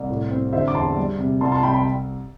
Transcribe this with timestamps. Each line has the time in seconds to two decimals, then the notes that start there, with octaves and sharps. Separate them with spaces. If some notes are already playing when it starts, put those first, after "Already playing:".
Already playing: C2
0.09 A2
0.31 C4
0.53 D3 C5 E5
0.68 D6
0.74 E2 A5 C6
0.96 G3
1.19 C3
1.41 C2 A5 C6
1.52 A5 C6
1.63 C2 G5 B5
1.74 G5 B5